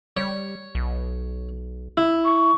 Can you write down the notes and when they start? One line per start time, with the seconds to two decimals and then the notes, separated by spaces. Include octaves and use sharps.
0.17 G3 C#5
0.75 B1
1.97 E4
2.25 C#6